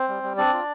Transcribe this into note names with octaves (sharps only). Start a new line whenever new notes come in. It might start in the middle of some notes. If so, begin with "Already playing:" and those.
Already playing: C4 C5
G3
G3
C4 D4 D5
F4